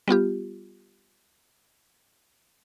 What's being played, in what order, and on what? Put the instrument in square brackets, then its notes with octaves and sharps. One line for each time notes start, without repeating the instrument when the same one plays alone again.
[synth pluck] G3 B3 F4 G4